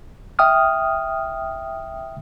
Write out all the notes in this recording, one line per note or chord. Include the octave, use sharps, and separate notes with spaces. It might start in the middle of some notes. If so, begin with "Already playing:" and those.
E5 G5 D#6 F6